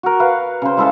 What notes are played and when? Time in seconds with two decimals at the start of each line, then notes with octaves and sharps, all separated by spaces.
0.03 F#4 A#4
0.20 B4 F5 F#5
0.62 C#3 C5
0.77 G#3 E4 A4 F5